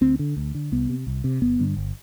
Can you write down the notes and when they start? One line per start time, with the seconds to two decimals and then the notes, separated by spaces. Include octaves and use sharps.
0.01 D2 C4
0.19 D3
0.37 D2
0.55 D3
0.72 C2 B3
0.89 C3
1.07 C2
1.24 C3
1.41 G1 B3
1.59 G2 D3
1.77 G1